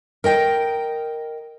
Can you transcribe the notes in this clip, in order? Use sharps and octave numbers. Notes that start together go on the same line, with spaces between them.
A#4 D#5 G5